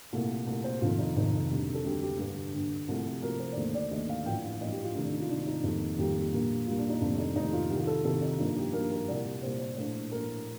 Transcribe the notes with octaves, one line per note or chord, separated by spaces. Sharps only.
C2 A#2 A3
C2 A#2 A3
C5
F1 F2 D#3 F4
D#4
F1 F2 D#3 D#4
D2 C3 G3
A4
D2 C3 G3 G4
G4
G2 D3 G3
G2 D3 G3
C2 C3 F3 A3
C2 C3 F3 A3 A#4
C5
D5
D#2 D3 A3 C5
D5
D#2 D3 A3 D#5
F5
A1 G2 F3 G5
F5
A1 G2 F3 D#5
G4
F4
D2 C3 D#3 A3 D#4
D4
D#4
F4
D2 C3 D#3 A3 D4
D#4
F2 D#3 G3 A#3
F2 D#3 G3 A#3 G4
A#1 A#2 G3 A#3
A#1 A#2 G3 A#3 F4
D4
D#4
F2 C3 D#3 A3 D4
D#4
F2 C3 D#3 A3 D#4
F4
C2 C3 D#3 G4
F4
A4
C2 C3 D#3 A4
D#4
G2 F3 A#3 D#4
G4
G2 F3 A#3 A#4
A#4
C2 A#2 G3 D5
C2 A#2 G3 C5
C5
A#1 A2 A3 C5
A#1 A2 A3 A#4